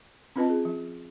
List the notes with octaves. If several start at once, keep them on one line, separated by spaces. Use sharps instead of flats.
C4 C#4 F4 B4 D#5 A5
G#4
F3